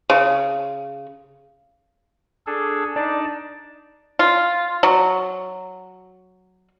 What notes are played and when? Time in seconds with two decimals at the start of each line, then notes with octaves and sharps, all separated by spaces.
0.10 C#3
2.47 D4 G#4 A4
2.96 D4 D#4 D5 A5
4.19 F4
4.83 F#3